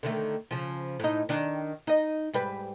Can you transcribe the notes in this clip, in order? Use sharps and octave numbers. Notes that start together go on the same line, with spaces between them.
D3 D#3 A3
C#3 F3
A2 D#4
D#3 D4
D#4 D#5
G#2 G3 B4